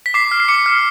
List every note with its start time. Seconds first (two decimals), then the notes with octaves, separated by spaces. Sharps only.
0.06 B6
0.14 D6 C7
0.31 F6
0.40 C7
0.48 D6 C#7
0.66 F6